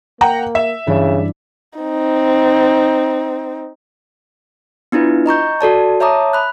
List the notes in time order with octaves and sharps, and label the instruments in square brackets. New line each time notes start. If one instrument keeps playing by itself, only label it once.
[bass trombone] A#3 [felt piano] F#5 G5 A#5
[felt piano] E5
[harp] G2 E3 D4 [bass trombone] C#3
[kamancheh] C4 D#4
[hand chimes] B3 D4 E4 F4 B4
D#5 A#5 C#6 G6
F#4 A4 D5 A5
C#5 E5 A5 A#5 D6 D#6
B5 F#6